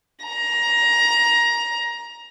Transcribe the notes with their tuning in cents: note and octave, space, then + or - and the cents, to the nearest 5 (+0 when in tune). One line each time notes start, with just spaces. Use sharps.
A#5 +20